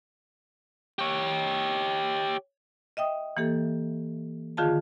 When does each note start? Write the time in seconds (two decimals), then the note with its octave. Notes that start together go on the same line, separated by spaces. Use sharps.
0.99 G4 C#5
2.97 D#5 E5 G5 D#6
3.37 E3 A#3 G4 A4
4.57 D3 D#3 F4 G#4 F5 A5